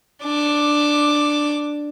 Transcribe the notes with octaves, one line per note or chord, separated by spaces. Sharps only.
D4 D6